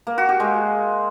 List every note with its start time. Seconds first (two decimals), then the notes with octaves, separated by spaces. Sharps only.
0.07 A#3
0.18 F#4
0.29 G4
0.40 G#3